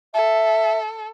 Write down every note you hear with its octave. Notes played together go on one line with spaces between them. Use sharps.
A4 E5